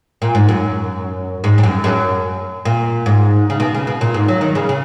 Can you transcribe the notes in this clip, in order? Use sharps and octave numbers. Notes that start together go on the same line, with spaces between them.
A#2
G#2
F#2
G#2
G#2
F#2
F#2
A#2
G#2
C#3
B2
C#3
B2
A#2
G#2
F#3
D#3
C#3
C#3